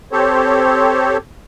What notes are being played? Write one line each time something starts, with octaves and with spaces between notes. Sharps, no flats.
C4 G4 A4 C5 C#5